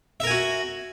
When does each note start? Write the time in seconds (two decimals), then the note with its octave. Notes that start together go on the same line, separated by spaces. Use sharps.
0.20 E5
0.23 A#4
0.27 G#5
0.30 F#4